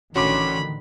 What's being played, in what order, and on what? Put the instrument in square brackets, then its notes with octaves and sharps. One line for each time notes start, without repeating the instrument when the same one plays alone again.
[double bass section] A1 D3 D#3 [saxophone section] C#4 [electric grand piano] F#4 C6 D6 [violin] B5